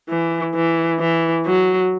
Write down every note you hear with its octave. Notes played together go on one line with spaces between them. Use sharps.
E3
E3
E3
F#3